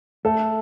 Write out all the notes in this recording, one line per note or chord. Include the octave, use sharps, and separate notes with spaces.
A3 A4